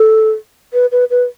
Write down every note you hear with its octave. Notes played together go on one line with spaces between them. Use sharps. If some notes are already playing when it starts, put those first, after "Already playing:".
Already playing: A4
B4
B4
B4